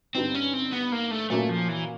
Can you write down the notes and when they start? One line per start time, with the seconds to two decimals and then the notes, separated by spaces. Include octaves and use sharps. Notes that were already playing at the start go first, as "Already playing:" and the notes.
0.15 G2 D3 G3 B3 C4 D#4
0.35 C#4
0.53 C4
0.72 B3
0.92 A#3
1.11 A3
1.30 A#2 F#3 A3 A#3 C#4 F#4
1.49 F3
1.68 E3